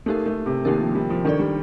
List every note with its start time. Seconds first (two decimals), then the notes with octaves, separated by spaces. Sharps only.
0.06 A3 A#3 D#4 G4 A#4
0.26 A3
0.46 C3
0.65 D#3 A#3 D#4 G4 A#4
0.80 F3
0.95 G3
1.10 F3
1.25 D#3 D4 A4 D5
1.39 G3